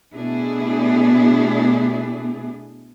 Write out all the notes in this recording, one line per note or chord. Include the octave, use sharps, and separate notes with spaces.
B2 A3 B3 D4 E4 G#4